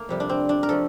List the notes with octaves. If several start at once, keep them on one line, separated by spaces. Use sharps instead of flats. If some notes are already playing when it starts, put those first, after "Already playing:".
Already playing: A3 A#3
F2 C3 G3
D4
C4
D4
A#4
F3 A3 A4